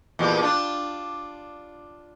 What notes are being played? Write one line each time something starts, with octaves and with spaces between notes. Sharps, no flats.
E2 A#2 G4
D4 F4